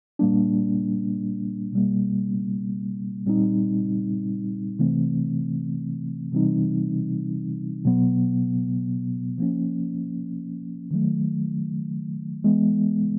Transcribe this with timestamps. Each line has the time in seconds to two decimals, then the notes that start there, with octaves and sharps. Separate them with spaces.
0.19 A#2 G3 A#3 D4
1.73 B2 G3 A#3
3.26 A#2 G3 C4 D#4
4.79 C3 E3 A3 C4
6.32 C3 E3 G3 C4 D#4
7.85 B2 F#3 B3
9.38 F3 A#3 C#4
10.91 D#3 F#3 A3
12.44 E3 G#3 B3